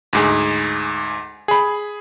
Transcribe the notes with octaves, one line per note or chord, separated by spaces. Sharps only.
D2 G#2 G#4
G#4 B5